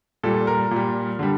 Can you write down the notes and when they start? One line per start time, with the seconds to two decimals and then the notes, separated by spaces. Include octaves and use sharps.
0.23 A#2 G3 A4
0.47 A#4
0.71 A#2
0.76 G3
1.19 D3 G3